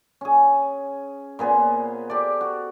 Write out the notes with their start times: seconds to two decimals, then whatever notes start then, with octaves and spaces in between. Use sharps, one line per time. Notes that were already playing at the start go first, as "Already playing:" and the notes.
0.21 C#4 G#4
1.39 A#2 B3 G#4 C5
2.10 G4 A4 D5
2.41 F#4